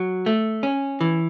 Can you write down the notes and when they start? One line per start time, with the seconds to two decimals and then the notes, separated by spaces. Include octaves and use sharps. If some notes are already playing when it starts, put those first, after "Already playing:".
Already playing: F#3
0.26 A3
0.63 C#4
1.01 E3